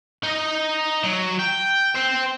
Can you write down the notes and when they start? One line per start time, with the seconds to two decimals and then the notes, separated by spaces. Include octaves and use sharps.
0.24 D#4 D#5
1.03 F#3
1.39 G5
1.96 C5 G5